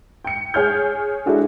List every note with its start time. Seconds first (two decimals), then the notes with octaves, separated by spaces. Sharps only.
0.24 G5 C#7
0.54 G#4 C#5 F6 G6
1.26 G#3 D4 E4 F#4 G#4 A4